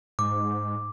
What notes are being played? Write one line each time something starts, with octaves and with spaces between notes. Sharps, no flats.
G#2 D6